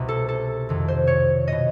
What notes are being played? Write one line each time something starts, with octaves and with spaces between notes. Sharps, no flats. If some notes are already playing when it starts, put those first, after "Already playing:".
Already playing: C2 B2
A4
A4
F2 C3 D#3
C5
C#5
B2 D#5